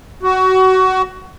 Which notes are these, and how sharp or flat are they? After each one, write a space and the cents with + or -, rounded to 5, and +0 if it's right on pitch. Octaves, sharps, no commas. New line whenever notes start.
F#4 +20